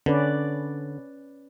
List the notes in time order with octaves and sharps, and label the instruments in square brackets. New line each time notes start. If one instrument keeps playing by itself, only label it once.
[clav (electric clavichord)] D3 [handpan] C#4 B4 D5